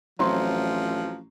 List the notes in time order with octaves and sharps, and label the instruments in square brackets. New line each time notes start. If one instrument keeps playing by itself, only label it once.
[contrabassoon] A1 [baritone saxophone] F3 [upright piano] F#3 C4 C6